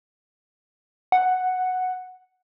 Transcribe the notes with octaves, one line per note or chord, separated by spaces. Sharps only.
F#5